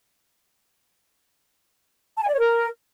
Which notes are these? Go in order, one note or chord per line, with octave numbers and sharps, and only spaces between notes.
A5
G#5
D5
C#5
A#4